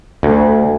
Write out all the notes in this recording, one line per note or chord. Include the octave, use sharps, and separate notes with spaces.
D2